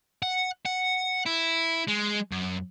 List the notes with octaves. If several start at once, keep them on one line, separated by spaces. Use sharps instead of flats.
F#5
F#5
E4
G#3
F#2